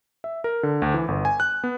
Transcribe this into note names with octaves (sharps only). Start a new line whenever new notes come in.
E5
A#4
D3
D2
E3
G1
G#5
F#6
B3